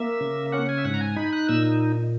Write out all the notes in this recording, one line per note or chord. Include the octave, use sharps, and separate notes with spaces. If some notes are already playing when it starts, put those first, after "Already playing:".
Already playing: A#3 E5
C#3
C#4 F#5
G#5
E5
G#2 F#5
A#5
G#5
D#4 B5
F#6
A#2 E6